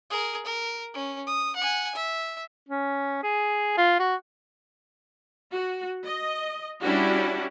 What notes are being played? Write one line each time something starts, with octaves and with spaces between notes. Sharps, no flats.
G#4 A#4
A#4
C#4
D#6
F#5 G#5
E5
C#4
G#4
F4
F#4
F#4
D#5
G3 C#4 D4 E4 F#4 G4